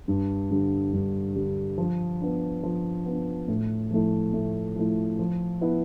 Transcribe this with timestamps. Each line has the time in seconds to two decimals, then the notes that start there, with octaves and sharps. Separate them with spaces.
0.08 G2
0.50 D3 G3
0.93 G2
1.35 D3 G3
1.78 F3
2.21 B3 D4
2.63 F3
3.06 B3 D4
3.48 A2
3.91 F3 A3 E4
4.33 A2
4.76 F3 A3 E4
5.19 F3
5.61 B3 E4 B4